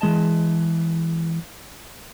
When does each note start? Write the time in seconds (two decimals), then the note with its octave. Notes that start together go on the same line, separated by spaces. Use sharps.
0.01 E3 G#3 D#5 A5